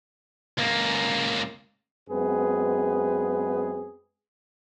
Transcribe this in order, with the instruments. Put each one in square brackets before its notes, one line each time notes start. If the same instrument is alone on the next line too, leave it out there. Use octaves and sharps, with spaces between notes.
[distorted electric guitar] C#2 A#3
[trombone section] F#2 G#3 B3 C4 G#4 B4